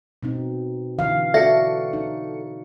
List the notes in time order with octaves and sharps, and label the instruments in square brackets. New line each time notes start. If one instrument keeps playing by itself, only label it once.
[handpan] B2 C4 D#4
D3 E3 F5
[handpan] F#4 D5 [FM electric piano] A4 C#7 [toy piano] E5
[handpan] D#4